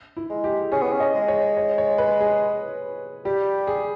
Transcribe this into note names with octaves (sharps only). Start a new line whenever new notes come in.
E4
G#3
G4
C#4 G#4
B3
C#4
D#5
G#3
C#5
C#5
C#5
B4
G#4
G3 G4
G#4